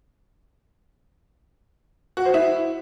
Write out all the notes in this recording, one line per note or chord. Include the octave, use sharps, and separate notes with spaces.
F#4
C5
E4